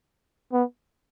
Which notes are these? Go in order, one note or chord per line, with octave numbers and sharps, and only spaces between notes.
B3